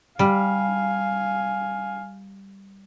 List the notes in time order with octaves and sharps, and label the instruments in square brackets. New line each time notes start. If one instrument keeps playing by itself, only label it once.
[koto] G3 [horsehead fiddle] F5 G#5